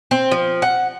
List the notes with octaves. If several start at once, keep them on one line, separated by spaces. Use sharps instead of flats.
C4
F3
F#5